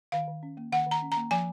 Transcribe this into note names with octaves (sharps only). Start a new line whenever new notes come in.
D#3 F5
D#3
C#4
A#3
D#3 F#5
D#3 A#5
C#4
A#5
A#3
F3 G#5